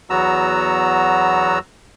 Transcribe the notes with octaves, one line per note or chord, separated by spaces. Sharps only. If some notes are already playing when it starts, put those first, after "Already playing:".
E2 F#3 B3 F#4 A#5 E6